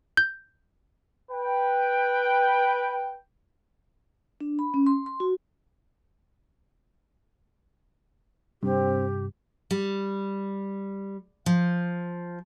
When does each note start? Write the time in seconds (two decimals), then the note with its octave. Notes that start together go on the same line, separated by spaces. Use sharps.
0.17 G6
1.32 B4 G5
4.41 D4
4.59 B5
4.74 C#4
4.87 C6
5.06 C6
5.20 F#4
8.63 G2 C3 C4 G4
9.71 G3
11.46 F3